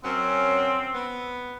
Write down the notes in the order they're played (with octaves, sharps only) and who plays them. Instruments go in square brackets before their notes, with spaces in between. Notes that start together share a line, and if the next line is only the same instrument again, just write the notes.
[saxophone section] F#2 F#3 C#4 [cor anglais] C4
[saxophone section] B3